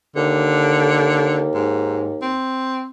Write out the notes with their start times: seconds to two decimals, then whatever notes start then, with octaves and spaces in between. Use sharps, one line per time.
0.16 D#2 D3
1.55 G#2
2.22 C4